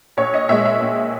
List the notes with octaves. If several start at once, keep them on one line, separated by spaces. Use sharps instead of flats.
A#1 C#5
D#5
A#2 G#3 E5
E5
A#1